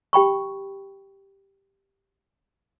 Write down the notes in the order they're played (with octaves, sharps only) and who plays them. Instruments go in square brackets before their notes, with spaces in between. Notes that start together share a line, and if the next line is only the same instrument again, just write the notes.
[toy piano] G4 G5 B5 C#6